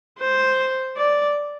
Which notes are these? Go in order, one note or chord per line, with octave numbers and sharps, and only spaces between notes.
C5
D5